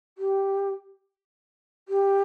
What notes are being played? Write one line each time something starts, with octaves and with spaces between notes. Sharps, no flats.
G4
G4